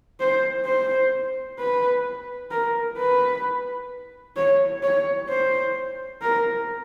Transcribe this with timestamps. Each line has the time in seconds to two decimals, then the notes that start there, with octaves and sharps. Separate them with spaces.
0.20 C5
0.65 C5
1.59 B4
2.51 A#4
2.98 B4
4.36 C#5
4.83 C#5
5.29 C5
6.22 A#4